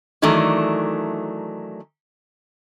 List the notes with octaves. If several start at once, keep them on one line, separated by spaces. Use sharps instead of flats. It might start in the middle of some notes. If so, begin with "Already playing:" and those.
D#3 E3 F#3 A3 D4